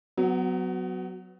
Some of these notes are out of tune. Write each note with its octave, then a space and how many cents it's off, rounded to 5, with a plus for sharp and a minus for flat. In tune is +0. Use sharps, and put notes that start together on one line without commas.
F#3 +0 B3 +30